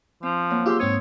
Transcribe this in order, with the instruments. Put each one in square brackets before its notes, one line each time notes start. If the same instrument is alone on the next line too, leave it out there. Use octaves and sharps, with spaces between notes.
[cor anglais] F3 [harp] C4
[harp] F#3 A#3
[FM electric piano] F4 G#4 F5 [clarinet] G4 [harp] C6 E6
[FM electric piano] G#2 C4 D#6 [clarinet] C#5